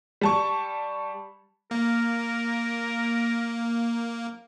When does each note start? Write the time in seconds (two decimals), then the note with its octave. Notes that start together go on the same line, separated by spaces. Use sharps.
0.21 G3 A5 C#6
1.71 A#3 A#4